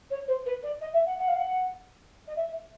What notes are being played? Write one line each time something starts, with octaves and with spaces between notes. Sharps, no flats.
C#5
C5
B4
D5
D#5
E5
F#5
F#5
F5
F#5
D#5
E5